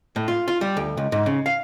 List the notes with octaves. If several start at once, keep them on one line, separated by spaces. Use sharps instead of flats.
A2
F4
F4
G3
D2
C#2
G#2
C#3
F5